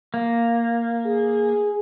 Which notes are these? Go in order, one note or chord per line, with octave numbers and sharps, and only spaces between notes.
A#3
G#4